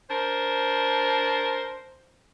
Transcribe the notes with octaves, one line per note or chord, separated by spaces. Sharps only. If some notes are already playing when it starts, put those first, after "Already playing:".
D4 A#4 C5